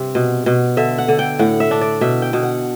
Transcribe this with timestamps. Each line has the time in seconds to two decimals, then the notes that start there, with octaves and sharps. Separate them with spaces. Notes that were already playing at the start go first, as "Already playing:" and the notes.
Already playing: G2 C3
0.15 B2
0.46 B2
0.77 D3 E5
0.98 F#5
1.08 D3
1.19 G5
1.39 A2 F#5
1.60 E5
1.71 D4
1.81 D5
2.01 B2 E5
2.22 G5
2.33 B2
2.43 F#5